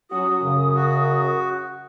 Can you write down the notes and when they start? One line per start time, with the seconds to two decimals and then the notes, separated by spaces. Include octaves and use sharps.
0.11 F#3 C#4 F#4 D#6
0.41 F#2 C#3
0.75 F#4